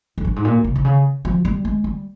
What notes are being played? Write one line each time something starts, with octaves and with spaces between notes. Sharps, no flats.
F2
G2
G#2
A#2
C3
C3
C#3
F3
G3
G#3
G3